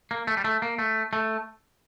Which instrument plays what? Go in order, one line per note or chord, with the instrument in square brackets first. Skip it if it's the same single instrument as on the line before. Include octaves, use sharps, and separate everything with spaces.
[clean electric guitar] A#3
A3
G3
A3
A#3
A3
A3